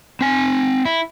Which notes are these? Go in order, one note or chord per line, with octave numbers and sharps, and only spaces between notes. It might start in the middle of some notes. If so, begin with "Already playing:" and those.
C4 G#5
E4